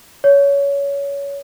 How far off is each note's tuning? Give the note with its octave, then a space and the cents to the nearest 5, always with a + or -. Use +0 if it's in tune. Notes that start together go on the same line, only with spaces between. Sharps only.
C#5 +20